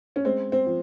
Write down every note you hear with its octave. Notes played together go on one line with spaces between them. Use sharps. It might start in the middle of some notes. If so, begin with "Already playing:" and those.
C#4
G#3 C4
C4
F3